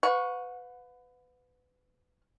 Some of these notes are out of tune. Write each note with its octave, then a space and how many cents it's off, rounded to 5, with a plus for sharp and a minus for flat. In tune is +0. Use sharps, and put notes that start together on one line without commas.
B4 +25 F#5 -40 C#6 +0